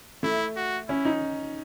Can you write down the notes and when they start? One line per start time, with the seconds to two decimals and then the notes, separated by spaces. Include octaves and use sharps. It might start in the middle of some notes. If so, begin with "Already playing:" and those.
0.23 A3 E4
0.56 F#4
0.88 C#4 E4
1.05 D#4